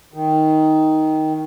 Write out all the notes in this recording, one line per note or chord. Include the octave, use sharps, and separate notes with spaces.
D#3